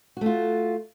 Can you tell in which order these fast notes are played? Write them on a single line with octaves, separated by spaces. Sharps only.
F#4 A3 F4